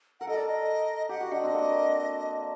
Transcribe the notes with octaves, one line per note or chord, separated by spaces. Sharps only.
A#4 F#5
A4 D#5
A#4 D5
D#5
G4 F#5
F#4
D4 D#5
C4
A#3